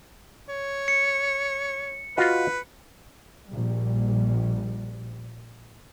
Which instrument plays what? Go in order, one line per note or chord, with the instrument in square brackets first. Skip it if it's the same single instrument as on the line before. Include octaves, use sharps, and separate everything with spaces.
[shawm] C#5
[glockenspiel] C#7
[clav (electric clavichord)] F4 F#4 D#5 [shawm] B4
[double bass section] A#1 G3